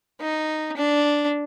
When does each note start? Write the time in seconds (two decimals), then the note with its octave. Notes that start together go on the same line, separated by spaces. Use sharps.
0.20 D#4
0.77 D4